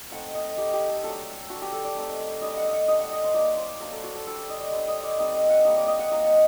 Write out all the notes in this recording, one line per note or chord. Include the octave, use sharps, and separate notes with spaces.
A3 C4 D#4 F#5
D#5
A3 D#4 G4
G4
A4
F#3 A3 D4 A4
A3 D4 F#4
G4
A4
D5
A3 C4 D#4
G3 D4 D#5
F#5
D#5
F#5
G3 D4 D#5
F#5
D#5
C5
F#3 A#3 D#4 D5
C5
F#3 A#3 D4 A#4
A4
F#4
A4
G3 D4 A4
D#5
D5
G3 D4 C5
D#5
D5
G3 C4 D#4 D#5
D#5
F#5
G3 A#3 D4 D#5
D5
D#5
F#5
F#3 A#3 D#4 D#5
F#5